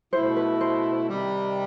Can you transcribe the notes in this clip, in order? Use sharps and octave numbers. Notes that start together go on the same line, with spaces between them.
B2 A3 E4 C5
B4
C5
C3 D#3 G3